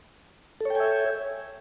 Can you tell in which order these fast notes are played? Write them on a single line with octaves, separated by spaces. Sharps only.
A4 C#5 G5 G#5 E5